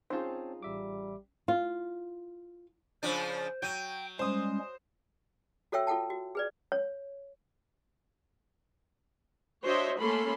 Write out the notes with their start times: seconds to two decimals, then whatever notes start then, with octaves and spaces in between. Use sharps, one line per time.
0.10 C4 C#4 D#4 F4 G#4 C5 C#5 A5
0.63 A1 G3 E5 D6
1.48 F4
3.03 C#3 F3 D4 C5
3.62 F#3 G5 G6 D#7
4.19 G3 G#3 C#4 C5 D#6
5.72 F#4 A4 C#5 E5 G5 E6
5.87 F4 A4 F#5 G5 A5
6.10 F#4
6.35 G#4 B4 D5
6.72 C#5
9.64 D4 F#4 C5 C#5 D#5 E5
10.00 A3 A#3 C#4 A4 B5 C6